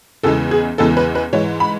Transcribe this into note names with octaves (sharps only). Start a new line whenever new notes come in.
E2 C#3 E3 G#3 B3 A4
G#4
E2 C#3 E3 G#3 B3 A4
B4
B4
G#2 E3 G#3 C#5
B5